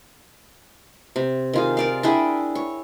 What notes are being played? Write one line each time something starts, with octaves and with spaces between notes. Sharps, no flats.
C3
D#3 F4 G#4
A#4 D5 F5
D4 E4 G#4 G5
C#5